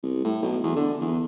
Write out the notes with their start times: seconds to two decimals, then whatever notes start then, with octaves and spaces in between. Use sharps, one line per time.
0.03 C2
0.25 A2
0.42 B1
0.63 E2
0.76 D3
1.01 E2